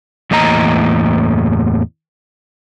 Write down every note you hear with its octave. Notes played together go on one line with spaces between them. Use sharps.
E2 A2 A#3 D#5 A#5